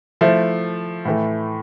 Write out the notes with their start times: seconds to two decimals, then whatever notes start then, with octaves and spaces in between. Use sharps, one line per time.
0.21 F3 A3 E4
1.05 A2 E3 A3